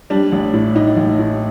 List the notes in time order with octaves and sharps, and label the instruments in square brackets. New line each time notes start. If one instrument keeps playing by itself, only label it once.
[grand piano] G3 D4
A1
A2
A2 D#4
A1
A2